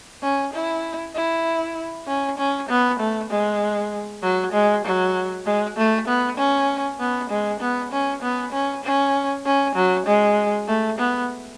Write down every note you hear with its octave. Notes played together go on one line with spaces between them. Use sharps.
C#4
E4
E4
C#4
C#4
B3
A3
G#3
F#3
G#3
F#3
G#3
A3
B3
C#4
B3
G#3
B3
C#4
B3
C#4
C#4
C#4
F#3
G#3
A3
B3